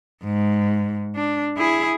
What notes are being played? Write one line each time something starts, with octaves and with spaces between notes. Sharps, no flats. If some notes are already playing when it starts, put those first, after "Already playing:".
G#2
D4
E4 G#4